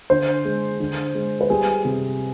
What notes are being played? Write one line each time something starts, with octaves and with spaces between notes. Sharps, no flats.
D3 C5
G#3
D3
G#3
B4
G3 G#4
C3